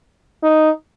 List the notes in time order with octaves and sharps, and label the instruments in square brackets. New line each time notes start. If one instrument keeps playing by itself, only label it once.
[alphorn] D#4